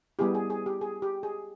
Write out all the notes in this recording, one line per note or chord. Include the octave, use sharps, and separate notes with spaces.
G3 B3 E4 G4 G#4
G#4
G#4
G4
G#4
G4
G#4